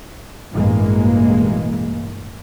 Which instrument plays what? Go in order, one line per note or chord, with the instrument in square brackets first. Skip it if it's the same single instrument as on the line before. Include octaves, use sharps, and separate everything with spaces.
[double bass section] A1 G2 B2 E3 G#3 A#3